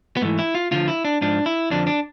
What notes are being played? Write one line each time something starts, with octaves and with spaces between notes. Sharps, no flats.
B3
G#2 E3 A3
E4
F4
D2 D3 F3 F4
E4
D4
G#2 F3 D4
E4
F2 D3 F3 D4
D4